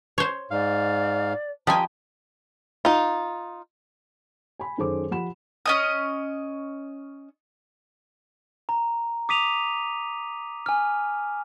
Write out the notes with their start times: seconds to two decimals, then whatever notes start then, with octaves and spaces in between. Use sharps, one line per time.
0.18 C5 C#5
0.51 G#2 D5 F5
1.67 F3 G4 D#5 G#5 A#5 B5
2.85 D#4 F4
4.60 G#5 B5
4.78 F#2 D#3 G#4 A4 C5 D6
5.11 F3 G4 F#5 B5 E7
5.66 C#4 D#5 D#6
8.69 A#5
9.29 D6 D#6 B6 D#7 F7
10.66 G#5 F6